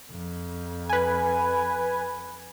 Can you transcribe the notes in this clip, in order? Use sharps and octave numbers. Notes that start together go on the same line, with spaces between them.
F2
B4 G#5